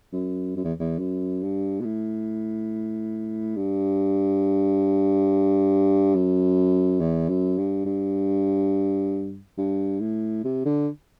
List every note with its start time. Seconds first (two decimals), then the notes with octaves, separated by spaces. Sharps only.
0.13 F#2
0.56 F#2
0.64 E2
0.79 E2
0.98 F#2
1.42 G2
1.80 B2
1.85 A2
3.56 G2
6.15 F#2
7.00 E2
7.29 F#2
7.58 G2
7.85 G2
9.58 G2
10.00 A2
10.44 C3
10.65 D3